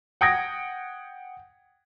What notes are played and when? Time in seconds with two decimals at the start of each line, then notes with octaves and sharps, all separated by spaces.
0.21 F#5 G5 D#6 G#6 A#6